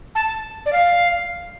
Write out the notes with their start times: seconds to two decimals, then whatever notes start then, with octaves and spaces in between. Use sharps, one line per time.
0.15 A5
0.66 D5
0.73 F5